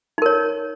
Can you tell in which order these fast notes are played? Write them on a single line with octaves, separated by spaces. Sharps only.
D#4 A#4 C#5